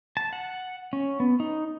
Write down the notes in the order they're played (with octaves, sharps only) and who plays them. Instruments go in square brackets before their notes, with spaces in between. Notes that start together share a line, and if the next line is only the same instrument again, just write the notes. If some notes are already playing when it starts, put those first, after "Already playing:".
[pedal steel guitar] A5
F#5
C#4
B3
D#4